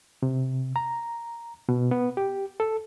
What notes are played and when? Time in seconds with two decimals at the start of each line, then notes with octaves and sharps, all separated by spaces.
0.23 C3
0.76 A#5
1.69 B2
1.91 B3
2.17 G4
2.60 A4